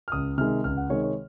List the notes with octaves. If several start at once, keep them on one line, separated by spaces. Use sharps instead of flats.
F6
C#2 D#6
C3 D#3 G#3 F6
C#2 F6
F#5
C3 D#3 G#3 C#5
C#5